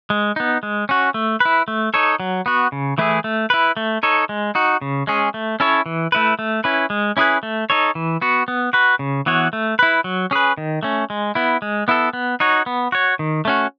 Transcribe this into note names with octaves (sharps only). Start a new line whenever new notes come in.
G#3
B3 D#4
G#3
C#4 F#4
A3
E4 B4
A3
D#4 A4 C#5
F#3
B3 F#4
C#3
E3 A3 E4 G#4
A3
E4 B4
A3
D#4 A4 C#5
G#3
D#4 F#4
C#3
G#3 C#4 G#4
A3
C#4 E4 A4 C#5
E3
A3 E4 B4
A3
C#4 E4 B4
G#3
C#4 E4 G#4 B4
A3
D#4 A4 C#5
E3
B3 F#4
B3
F#4 B4
C#3
E3 B3 F#4 C#5
A3
E4 B4
F#3
C#4 G#4 B4
D#3
A3 C#4
G#3
B3 E4
G#3
B3 E4 A4
B3
D#4 F#4 C#5
B3
F#4 C#5
D#3
A3 C#4 F#4